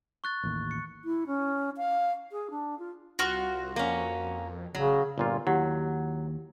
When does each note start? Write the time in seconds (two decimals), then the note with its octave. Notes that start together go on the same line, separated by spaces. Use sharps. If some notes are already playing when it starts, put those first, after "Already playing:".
0.24 C#6 F#6 A6
0.43 A1 D#2
0.71 C#7
1.04 E4
1.26 C#4
1.77 F5
2.32 G#4
2.50 D4
2.79 F4
3.19 C2 F4 F#4
3.76 F2 A#3 C#4
4.75 A1 C#3 F#3
5.18 G1 A#2 F4
5.47 D#2 F#3 E4 G4 F#5